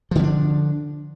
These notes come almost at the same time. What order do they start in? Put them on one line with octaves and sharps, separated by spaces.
F3 D3 C#4 D4